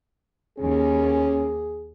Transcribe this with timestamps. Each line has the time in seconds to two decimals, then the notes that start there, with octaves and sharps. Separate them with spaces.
0.59 D#2 A#3 C#4 G#4